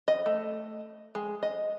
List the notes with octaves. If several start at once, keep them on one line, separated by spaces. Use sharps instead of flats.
D#5
A3
G#3
D#5